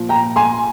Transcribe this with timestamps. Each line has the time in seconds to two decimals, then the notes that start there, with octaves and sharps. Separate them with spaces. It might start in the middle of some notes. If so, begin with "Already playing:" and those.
Already playing: A#2 F3
0.09 G5 A#5
0.36 G#5 C6